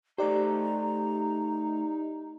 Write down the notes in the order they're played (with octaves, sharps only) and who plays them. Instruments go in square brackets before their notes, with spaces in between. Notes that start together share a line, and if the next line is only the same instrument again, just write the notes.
[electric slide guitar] A3 A4 C5 [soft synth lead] D#4 [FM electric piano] G4 D5 [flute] A#5